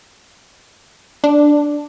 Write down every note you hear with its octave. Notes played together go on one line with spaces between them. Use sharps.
D4